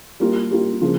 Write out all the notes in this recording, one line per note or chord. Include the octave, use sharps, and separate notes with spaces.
G3 A#3 F4
G3 A#3 F4
C#3 F3 A#3 F4